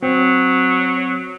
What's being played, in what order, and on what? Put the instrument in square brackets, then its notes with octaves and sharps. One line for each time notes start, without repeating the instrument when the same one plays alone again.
[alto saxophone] F#3 [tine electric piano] C4